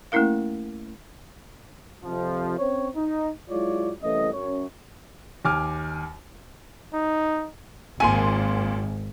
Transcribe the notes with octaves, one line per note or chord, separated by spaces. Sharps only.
A3 A#3 C#4 E4 A#4 F5
F2 C3 F3
C4 C#4 C5 C#5
D#4
F#3 G#3 E4 F4 C#5 D5
C2 E3 A3 C#4 D#5
F#2 C#4 C#5
D#2 G#5 D6 F6
D#4
G#1 D#2 A#2 G#5 C6